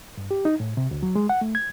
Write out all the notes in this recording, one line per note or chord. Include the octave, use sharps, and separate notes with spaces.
G2
G4
D#4
A2
C3
D2
F#3
G#3
F#5
A3
G#6